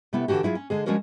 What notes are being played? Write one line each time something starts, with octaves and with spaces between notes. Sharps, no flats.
C3 A3 B3 E4
D3 E3 D#4 F#4 G4
F#3 E4 F4 G#4
C#4
D3 G#3 G#4
F3 G#3 C#4 F#4 A#4 D5